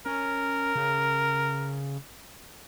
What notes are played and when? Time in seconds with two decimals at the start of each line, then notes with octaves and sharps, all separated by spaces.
0.06 C#4 A#4
0.75 C#3